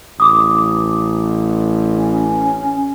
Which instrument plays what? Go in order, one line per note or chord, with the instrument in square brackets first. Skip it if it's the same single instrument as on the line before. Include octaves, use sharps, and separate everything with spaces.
[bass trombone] A1 [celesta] D6 D#6
[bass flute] C#4